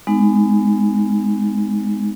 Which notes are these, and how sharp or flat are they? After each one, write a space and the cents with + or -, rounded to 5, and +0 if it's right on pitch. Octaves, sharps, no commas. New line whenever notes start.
G#3 +0 B3 +35 D#4 +0